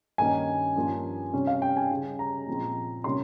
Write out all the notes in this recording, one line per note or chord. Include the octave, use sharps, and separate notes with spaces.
G2 D#3 A#3 C#4 G#5
G2 F3 A#3 C#4
C3 G3 C#4
F5
G5
G#5
C#3 G3 C#4
A#5
A#2 F3 G#3 C4
C3 G3 A#3 C#4 C6